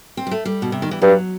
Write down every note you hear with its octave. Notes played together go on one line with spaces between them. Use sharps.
C4
G3
A3
G3
B2
C3
D#3
E3
G2 F#3